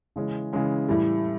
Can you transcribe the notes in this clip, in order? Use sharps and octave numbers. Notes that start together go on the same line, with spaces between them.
C#3 E3 G#3 C#4
C#3 E3 G#3 C#4
A2 E3 G3